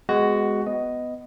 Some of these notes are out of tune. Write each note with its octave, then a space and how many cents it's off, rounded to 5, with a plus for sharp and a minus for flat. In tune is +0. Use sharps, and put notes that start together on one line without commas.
G#3 +0 B3 +20 F#4 +10
B3 +10 D#5 +0